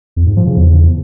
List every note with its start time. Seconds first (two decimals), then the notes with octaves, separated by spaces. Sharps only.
0.16 F2
0.26 G#2
0.36 F3
0.46 C#3
0.57 E2